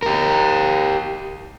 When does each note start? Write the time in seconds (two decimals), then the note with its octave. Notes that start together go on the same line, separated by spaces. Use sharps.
0.03 G4 A#4